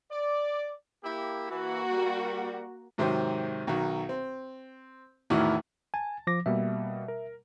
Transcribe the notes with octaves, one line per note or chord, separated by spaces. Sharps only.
D5
A#3 E4 G4
E3 A#3 F#4
G3
G#2 C3 D#3 F#3 C5
B1 D#3 F#4
C4
A1 E2 A2 D#3 E4 F#4
G#5 A5
F3 D6 A#6
B2 G3 A#3 E5
A#4